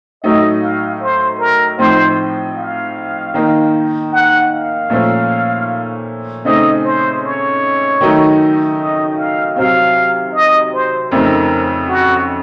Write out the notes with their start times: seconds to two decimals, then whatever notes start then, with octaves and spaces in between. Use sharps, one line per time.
0.24 A2 F#3 A3 D#4 D#5
0.62 F5
1.02 C5
1.40 A#4
1.79 A2 F3 C4 D#4 C5
2.57 F5
3.34 D#3 A#3 D#4
4.12 F#5
4.52 F5
4.90 A#2 F3 A3 C#4
6.45 C#3 A3 C4 D#4 D#5
6.85 C5
7.23 C#5
8.01 D#3 F#3 A3 D#4
8.79 D#5
9.17 F5
9.56 C3 F#3 C4 F5
10.33 D#5
10.73 C5
11.11 F2 C#3 A3 C4 D#4 A#4
11.89 F#4